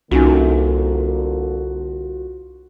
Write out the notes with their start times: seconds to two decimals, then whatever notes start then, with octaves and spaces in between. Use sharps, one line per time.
0.11 C2 D3 A#3 C#4 D#4 F4 F#4 G#5